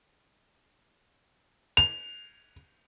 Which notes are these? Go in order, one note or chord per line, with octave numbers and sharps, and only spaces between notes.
F7